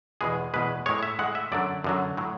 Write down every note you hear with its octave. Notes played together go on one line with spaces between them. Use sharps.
E2 B2 G#3 G#4
E2 B2 G#3 B4
A2 G#3 C#5
E5
A2 G#3 F#5
E5
F#2 D3 F#3 D5
F#2 D3 F#3
A2 F#3